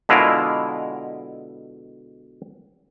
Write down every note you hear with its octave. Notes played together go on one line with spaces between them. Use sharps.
B2 D3 G#3 E4 F4 A#4